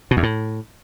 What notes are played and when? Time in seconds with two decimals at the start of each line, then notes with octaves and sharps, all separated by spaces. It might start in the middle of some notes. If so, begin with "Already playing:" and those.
0.11 B2
0.17 E2
0.23 A2